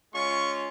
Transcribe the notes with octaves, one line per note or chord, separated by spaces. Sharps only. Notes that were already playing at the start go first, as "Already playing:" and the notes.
G#3 C#4 F4 C#6